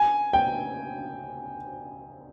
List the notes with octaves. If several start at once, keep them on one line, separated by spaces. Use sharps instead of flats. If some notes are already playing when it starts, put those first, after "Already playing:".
Already playing: G#5
G5